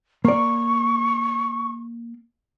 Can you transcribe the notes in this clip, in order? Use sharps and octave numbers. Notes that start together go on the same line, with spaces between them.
A#3 D5 C#6